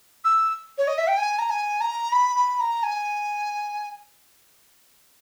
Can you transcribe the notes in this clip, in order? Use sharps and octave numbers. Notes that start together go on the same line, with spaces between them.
E6
C#5
D#5
E5
G5
G#5
A#5
G#5
A#5
B5
B5
A#5
G#5